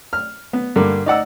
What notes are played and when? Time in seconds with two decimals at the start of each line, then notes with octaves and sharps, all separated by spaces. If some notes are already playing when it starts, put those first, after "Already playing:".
0.13 F6
0.53 B3
0.76 G2 D3 A#3
1.06 D#4 D5 F#5 E6